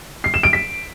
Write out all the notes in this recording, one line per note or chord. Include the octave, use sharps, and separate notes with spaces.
C7
E7
D7
B6